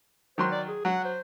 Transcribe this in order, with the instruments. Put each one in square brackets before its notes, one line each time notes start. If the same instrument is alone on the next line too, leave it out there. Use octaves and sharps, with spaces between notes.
[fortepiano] D#3 F#3 C6 [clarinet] C5
[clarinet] D5
G#4
[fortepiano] F#3 [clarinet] F#5
[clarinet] C5